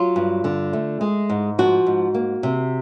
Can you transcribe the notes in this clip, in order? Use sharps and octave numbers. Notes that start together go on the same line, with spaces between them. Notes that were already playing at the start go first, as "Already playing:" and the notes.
Already playing: F#3 F4
G2
D3
A3
G#3
G#2
F3 F#4
G#2
A#3
C3